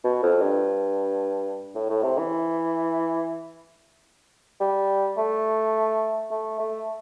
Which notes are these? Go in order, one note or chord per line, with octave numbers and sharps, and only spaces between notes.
B2
F2
G2
A2
A2
C3
E3
G3
A3
A3
A3